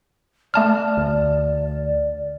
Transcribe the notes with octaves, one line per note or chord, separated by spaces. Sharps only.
A3 D5 A5 F6
D2